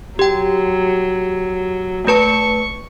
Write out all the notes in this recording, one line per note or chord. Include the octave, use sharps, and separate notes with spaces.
F#3 G4 G5
A3 B4 A5 C#6